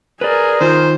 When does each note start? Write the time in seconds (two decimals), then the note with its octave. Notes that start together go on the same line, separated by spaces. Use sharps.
0.21 G#4 A#4 B4 D5
0.61 D#3 D#4 F4 C5